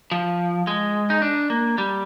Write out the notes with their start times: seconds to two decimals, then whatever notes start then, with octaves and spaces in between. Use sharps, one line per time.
0.12 F3
0.67 G#3
1.10 D#4
1.22 D4
1.50 A#3
1.78 G3